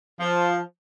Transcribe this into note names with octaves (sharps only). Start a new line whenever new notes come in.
F3